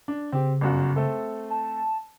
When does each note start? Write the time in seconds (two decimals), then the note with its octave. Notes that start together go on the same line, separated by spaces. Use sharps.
0.08 D4
0.32 C#3 C4 G4
0.61 G1 F#2 F#4
0.96 A3 C4 A4
1.50 A5